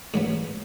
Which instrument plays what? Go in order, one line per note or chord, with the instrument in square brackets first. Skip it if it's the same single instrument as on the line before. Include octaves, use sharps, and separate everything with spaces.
[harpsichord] A1 G#2 F#3 B3